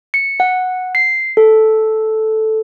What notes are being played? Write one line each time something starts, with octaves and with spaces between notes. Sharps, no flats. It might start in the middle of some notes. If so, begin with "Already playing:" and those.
C#7
F#5
C7
A4